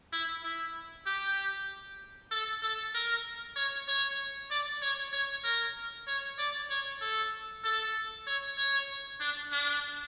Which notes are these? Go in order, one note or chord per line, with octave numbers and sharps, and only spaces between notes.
E4
E4
G4
A4
A4
A#4
C#5
C#5
D5
C#5
C#5
A#4
C#5
D5
C#5
A4
A4
C#5
C#5
D4
D4